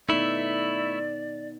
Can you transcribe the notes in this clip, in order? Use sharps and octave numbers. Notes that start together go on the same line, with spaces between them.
A3 B3 D#4 E4 D5